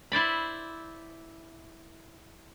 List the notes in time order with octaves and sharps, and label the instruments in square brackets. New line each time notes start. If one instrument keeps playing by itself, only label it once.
[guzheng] E4 C5 D5 B5